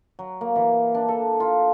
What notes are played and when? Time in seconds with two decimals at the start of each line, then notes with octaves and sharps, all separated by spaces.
0.19 F#3
0.41 A#3
0.56 E3
0.94 D4
1.08 A4
1.40 F4